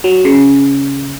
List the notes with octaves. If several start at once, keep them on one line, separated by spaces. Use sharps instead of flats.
F#3
C#3